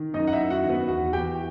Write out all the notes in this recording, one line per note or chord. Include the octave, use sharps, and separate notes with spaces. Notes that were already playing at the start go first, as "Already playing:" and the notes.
Already playing: D#3
F#2 D#4 D#5
F#5
E4 E5
F#2
F#4 F#5
D#3
B3 B4
E2 F#4 F#5
E3 G4 G5